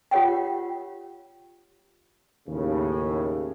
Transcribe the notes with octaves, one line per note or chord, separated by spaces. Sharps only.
F4 G4 C#5 F#5 G5
D#2 A2 C#3